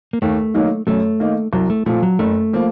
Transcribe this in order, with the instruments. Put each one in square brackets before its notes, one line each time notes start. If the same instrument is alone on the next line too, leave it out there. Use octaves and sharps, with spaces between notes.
[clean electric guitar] A#3
[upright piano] D#2 [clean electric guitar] A3
[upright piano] D#3 F#3 A#3 D#4
[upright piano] F#2 [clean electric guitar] A3
[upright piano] D#3 A#3 D#4
[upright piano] C2 [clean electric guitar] F#3
[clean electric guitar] A3
[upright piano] A#2 F3 C4 [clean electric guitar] A3
[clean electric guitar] F#3
[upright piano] F#1 [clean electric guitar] A3
[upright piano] F3 A#3